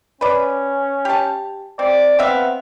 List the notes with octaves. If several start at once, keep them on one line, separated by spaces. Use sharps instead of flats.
C#4 B4 D5
G4 A5
C4 D5
B3 C4 E5 F5